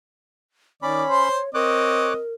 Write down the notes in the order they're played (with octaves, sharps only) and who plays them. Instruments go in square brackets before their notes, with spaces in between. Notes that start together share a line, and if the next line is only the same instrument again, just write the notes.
[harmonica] D#3 D5 [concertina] C#4 B5 [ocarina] C#5
[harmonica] C5 C6
[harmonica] C4 D#5 [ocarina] A#4 [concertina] C#5 D6 F#6